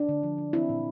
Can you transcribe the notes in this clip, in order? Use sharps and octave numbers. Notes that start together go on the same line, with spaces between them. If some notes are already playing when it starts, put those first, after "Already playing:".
Already playing: D4
D3
F3
D3
C4 E4
A#2